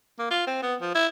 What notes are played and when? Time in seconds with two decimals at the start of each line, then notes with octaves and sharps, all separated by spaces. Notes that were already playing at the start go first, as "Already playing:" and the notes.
0.19 A#3
0.31 F4
0.47 C4
0.63 B3
0.82 F3
0.95 E4